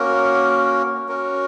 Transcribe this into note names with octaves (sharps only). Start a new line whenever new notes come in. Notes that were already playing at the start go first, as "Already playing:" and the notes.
Already playing: A#3 C#4 F#4 A#4
C#4 F#4 A#4